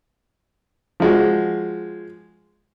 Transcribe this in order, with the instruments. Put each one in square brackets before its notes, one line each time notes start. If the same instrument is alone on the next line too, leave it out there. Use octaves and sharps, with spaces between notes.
[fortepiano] F3 G#3 F#4